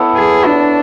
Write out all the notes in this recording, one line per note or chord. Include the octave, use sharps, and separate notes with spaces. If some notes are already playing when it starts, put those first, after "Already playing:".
Already playing: B3 E4 A4 C#5
G#4
D4